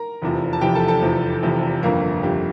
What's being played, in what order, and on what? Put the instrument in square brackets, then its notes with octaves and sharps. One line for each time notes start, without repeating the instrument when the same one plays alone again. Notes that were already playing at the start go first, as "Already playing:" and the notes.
Already playing: [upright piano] A#4 A#5
F1 E2 C3 F3
A5
F1 E2 C3 F3 G4 G5
A4 A5
A4 A5
F1 E2 C3 F3
F1 E2 C3 F3
G1 F2 D3 A#3 A#4
G1 F2 D3 G4